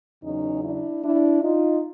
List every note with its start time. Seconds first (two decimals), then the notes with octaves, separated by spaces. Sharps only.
0.23 E2 C#3 F#3 C#4 D#4
0.63 D4 E4
1.03 D4 E4
1.43 D#4 F4